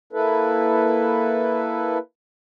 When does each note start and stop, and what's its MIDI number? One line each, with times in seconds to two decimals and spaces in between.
0.13 1.98 58
0.13 1.98 64
0.13 1.98 69
0.13 1.98 71